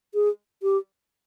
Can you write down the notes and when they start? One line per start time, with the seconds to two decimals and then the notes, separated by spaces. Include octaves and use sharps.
0.14 G#4
0.63 G4